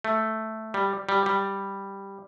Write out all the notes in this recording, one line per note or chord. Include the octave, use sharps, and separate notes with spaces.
A3
G3
G3
G3